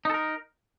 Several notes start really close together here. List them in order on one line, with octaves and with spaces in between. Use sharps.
D#4 A4 A#4